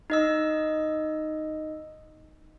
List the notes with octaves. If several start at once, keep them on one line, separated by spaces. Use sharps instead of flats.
D#4 D#5 E6